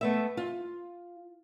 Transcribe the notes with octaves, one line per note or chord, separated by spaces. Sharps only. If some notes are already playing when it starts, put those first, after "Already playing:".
A3 B3 E5
F4